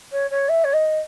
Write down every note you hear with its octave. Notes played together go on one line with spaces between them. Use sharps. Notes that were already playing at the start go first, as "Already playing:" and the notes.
C#5
C#5
E5
C#5
D#5